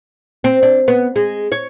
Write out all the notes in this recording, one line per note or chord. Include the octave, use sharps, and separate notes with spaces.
C4
D4
B3
G#3
C#5